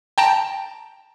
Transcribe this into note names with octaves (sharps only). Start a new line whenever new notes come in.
G5 A5 A#5